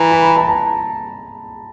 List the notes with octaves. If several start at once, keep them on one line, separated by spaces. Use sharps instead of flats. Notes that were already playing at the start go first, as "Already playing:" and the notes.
Already playing: E3 A#5
B5
A#5
A5
A#5